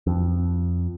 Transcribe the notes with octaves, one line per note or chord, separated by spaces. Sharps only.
F2